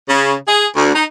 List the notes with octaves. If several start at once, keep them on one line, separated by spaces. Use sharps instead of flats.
C#3
G#4
D2
D#4